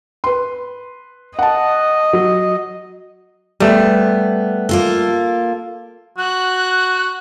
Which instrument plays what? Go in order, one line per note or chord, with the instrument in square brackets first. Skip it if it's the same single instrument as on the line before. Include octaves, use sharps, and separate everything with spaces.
[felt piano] B4 C6
[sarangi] D#5 [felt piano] F#5 A5
[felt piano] F#3
[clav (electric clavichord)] G3 A3 [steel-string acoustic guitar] B3
[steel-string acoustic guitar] A#3 F4 A4
[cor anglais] F#4 [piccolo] F#6